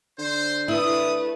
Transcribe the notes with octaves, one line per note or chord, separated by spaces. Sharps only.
D3 C5
A3 E4 B4 D#6